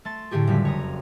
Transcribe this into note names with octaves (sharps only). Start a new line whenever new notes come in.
A3 A5 C6 A6
A2 D3 A3 G4 G#4
F#1 F2 G3 B6
C#5 A#5 D#6